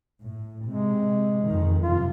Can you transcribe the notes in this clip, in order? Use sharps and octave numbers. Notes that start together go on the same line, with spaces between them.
A2
C3 G#3
F2 D#3
F#2 C3 F4